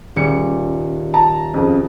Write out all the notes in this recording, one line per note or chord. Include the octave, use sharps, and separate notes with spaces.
D#1 C#3 C#7
A5 A#5
F2 C#3